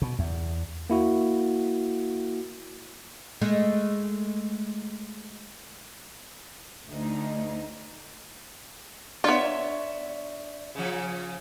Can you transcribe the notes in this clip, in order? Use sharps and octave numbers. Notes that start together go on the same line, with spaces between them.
B2
E2
A#3 E4 F#4
G#3 A3
D2 D#4
B3 D4 F4 C#5 E5
C#3 F3